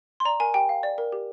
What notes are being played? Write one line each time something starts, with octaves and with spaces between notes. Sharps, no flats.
C6
D5 A#5
A#4 G#5
G4 G5
F5
D5
A#4
G4